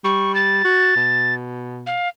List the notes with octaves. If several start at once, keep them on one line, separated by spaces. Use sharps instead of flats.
G3 C#6
A6
F#4
B2
F5